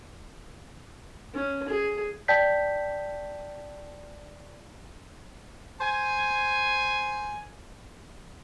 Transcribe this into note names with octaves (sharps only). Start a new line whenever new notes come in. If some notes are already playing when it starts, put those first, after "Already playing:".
C#4
G#4
D5 G5 A5 G6 B6
C5 G#5